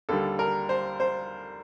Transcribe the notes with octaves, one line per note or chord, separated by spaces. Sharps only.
D#2 D3 G3 A4
A#4
C5
C5